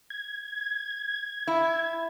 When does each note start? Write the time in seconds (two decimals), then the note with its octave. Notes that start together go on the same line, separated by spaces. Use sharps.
0.10 G#6
1.47 E4